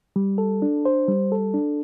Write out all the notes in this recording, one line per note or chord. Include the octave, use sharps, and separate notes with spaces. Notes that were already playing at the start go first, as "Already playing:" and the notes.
G3
A4
D4
C5
G3
A4
D4